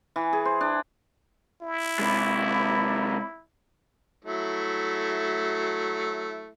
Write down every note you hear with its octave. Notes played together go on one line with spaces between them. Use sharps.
E3
G#4
C5
D4
E4
C3 G#3 B5 D6
F#3 A3 E4